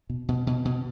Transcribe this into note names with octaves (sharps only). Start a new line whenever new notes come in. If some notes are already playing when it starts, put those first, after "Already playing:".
B2
B2
B2
B2